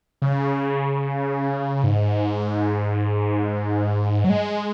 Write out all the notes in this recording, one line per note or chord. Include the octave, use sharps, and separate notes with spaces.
C#3
G#2
F#3
G#3